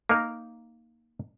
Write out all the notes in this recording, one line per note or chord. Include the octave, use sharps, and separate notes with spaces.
A#3 D#4 A#4